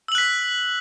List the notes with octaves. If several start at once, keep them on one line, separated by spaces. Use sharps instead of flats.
E6 F#6 B6 F#7